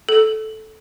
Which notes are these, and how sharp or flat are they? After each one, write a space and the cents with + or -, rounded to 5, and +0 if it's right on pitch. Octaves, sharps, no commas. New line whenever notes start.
A4 -10